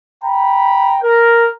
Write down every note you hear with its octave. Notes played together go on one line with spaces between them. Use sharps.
G5 A#5 B5
A#4